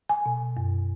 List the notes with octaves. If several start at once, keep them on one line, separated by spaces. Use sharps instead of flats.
G#5
B2
F#2